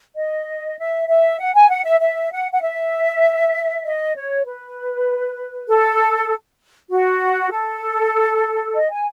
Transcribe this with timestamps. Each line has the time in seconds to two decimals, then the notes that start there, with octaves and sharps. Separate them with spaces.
0.16 D#5
0.79 E5
1.08 E5
1.40 F#5
1.54 G#5
1.70 F#5
1.85 E5
2.00 E5
2.32 F#5
2.52 F#5
2.62 E5
3.84 D#5
4.15 C#5
4.45 B4
5.68 A4
6.91 F#4
7.51 A4
8.75 D#5
8.90 G#5